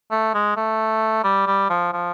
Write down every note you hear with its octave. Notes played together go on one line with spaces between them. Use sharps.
A3
G#3
A3
G3
G3
F3
F3